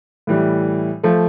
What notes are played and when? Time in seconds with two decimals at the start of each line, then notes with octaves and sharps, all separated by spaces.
0.27 A2 E3 G3
1.03 F3 A3